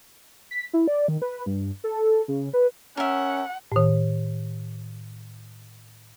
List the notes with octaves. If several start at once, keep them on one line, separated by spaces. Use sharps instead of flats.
B6
E4
D5
D#3
B4
G2
A4
C#3
B4
C#4 A#4 E5 F#5
A2 D#3